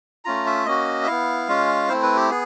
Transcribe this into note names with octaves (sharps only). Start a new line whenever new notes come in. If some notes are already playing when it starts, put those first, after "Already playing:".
A3 C#4 F4 A#5
E5
A#3 C#4 F#4 D#5
E5
B3 E4 F5
G#3 C#4 F4
A3 C4 E4 C5
B4
G4
B3 G#4